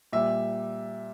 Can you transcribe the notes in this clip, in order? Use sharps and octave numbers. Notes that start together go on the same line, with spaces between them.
A#2 G3 E5